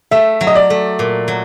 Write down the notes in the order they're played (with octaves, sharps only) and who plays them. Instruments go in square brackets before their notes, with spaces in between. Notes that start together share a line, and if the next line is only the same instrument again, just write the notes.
[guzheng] A3 [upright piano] E5
[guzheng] F#3
[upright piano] D#5
D5
[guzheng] A3
A#2
F#3